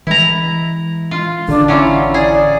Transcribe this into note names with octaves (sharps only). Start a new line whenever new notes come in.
E3 G#3 E4 A#5
F4
A1 D3 D4
F#3 C#4 E4 F4
G#4 D5